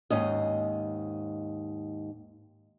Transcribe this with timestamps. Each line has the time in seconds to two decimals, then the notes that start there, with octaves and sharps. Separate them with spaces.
0.10 D#2 G#2 C#4 D#5